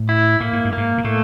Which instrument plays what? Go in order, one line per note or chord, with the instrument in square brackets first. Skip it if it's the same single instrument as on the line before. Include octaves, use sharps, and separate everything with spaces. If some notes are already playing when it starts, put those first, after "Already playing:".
Already playing: [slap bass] A2
[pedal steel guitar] E4
[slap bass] A2 [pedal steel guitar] A#3
[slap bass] G#2
G2
[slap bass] G#2 [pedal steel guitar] A#3
[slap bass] A#2
[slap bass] A2 [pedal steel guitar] A3